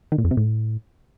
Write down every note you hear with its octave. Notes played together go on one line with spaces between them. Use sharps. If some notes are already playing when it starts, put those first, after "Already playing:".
D#3
A#2
F2
C3
A2